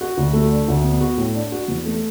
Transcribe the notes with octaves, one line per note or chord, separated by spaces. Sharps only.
F#4
D2
A3
D4
D2
B3
F#4
A2
D4
F#4
E2
A3